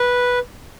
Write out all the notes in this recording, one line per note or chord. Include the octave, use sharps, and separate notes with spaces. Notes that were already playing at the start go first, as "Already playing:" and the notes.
Already playing: B4